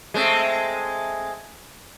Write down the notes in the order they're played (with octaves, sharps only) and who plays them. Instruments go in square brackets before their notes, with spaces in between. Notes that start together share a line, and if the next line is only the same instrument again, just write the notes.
[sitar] G#3 A3 C4